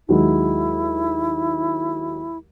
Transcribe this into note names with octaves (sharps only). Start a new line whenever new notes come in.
D#2 F#3 G#3 E4